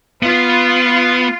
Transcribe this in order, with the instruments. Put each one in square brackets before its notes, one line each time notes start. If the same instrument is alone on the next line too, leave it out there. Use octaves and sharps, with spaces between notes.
[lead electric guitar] B3 [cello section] F4